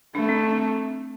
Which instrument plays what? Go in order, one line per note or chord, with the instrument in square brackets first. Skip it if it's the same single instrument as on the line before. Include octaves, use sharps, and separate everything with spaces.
[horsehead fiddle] A3 [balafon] D4
[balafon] C4
C4